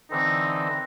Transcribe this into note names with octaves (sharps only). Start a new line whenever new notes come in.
D3 E3 C4 D#4